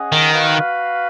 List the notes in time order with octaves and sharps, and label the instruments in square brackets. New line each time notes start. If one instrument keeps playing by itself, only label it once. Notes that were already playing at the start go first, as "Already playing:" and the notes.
Already playing: [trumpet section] C#4 G#4 D#5 F#5
[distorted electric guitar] D#3
[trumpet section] F#4 B4 F5